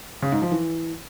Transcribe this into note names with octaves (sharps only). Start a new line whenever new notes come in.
C#3
G#2
F3
E3